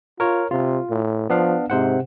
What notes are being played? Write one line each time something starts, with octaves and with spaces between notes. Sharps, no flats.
F4 A#4 C#5
C3 F4
A2
F3 B3 D4 F5
G#2 C3 C5 F#5